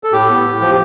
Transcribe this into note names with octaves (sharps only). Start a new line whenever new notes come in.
A4
A2 G4
B3
A2
F3